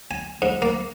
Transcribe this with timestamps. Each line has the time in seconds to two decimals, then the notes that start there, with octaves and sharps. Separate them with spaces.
0.11 G#5
0.42 G#2
0.62 A#3